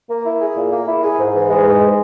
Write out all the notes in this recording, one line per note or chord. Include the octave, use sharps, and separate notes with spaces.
A#3
E4
G#4
A#2
A#3
E4
G#4
G#2
E3
G#3
G#2